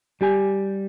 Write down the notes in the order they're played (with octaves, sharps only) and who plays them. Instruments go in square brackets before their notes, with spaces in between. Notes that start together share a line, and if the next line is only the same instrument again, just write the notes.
[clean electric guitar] G3 G4 G#5